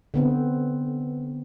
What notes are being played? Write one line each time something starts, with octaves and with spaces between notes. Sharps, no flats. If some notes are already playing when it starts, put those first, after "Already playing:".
D3 B3 C4